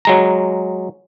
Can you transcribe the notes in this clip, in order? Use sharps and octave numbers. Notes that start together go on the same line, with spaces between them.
F#3 G#3 A#5